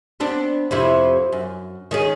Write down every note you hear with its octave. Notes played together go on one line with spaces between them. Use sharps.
B3 C4 D4
F2 C3 E4
F#2
D#3 C#4 G#4